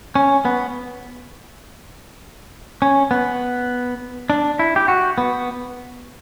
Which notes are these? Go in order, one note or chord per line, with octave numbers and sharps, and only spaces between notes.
C#4
B3
C#4
B3
D4
E4
G4
F#4
B3